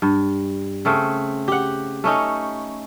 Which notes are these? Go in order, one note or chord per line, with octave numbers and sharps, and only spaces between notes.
G2
C#3 A3 C4
G4 F#5
A3 C#4 D#4